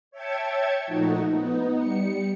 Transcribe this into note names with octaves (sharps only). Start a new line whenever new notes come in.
C#5 E5 G5 A5 C#6 G#6
A#2 F3 A3 D#4 F#4
B3 D#4
G3 C#7